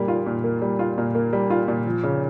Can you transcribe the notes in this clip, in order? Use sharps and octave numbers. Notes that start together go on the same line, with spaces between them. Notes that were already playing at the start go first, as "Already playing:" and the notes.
Already playing: A#2 G3 A#3
F4
A#2
A#3
G3
F4
A#2
A#3
G3
F4
A#2
F3
C#3